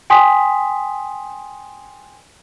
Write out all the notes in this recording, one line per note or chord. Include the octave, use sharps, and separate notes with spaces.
G5 G#5 C6 D#6 B6